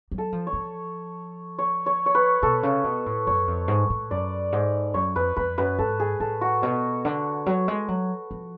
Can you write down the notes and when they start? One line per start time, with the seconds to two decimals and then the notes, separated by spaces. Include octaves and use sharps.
0.11 F#3
0.18 A4
0.32 F3
0.47 C#5
0.53 F3
1.58 C#5
1.86 C#5
2.06 C#5
2.15 B4
2.43 B2 A4
2.63 C#3
2.84 B2
3.06 A2
3.27 F#2 C#5
3.48 F2
3.68 G#2
3.90 A2
4.11 F#2 D5
4.52 G#2
4.94 F#2 C#5
5.16 F2 B4
5.36 F2 B4
5.58 F#2 B4
5.79 G#2 A4
6.00 G#4
6.20 A2 A4
6.41 F#4
6.62 B2 C#5
7.05 D3
7.46 F#3
7.68 G#3
7.88 F#3
8.31 F3